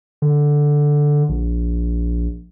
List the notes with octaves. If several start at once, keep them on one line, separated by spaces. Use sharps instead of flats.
D3
A#1